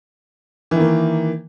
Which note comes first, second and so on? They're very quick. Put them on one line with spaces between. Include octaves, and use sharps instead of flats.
E3 D#3 A#3